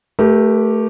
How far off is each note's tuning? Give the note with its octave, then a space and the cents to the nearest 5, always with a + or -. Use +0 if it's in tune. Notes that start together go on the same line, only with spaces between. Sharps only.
A3 +0 G4 +0 A#4 +40